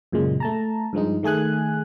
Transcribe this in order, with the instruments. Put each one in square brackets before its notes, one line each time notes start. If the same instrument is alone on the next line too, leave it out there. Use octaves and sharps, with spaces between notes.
[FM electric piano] F#2 A#2 C#3 G#3
A3 A5 A#5
G2 F3 G#3 D#4
D#3 A3 G#4 G#5 F#6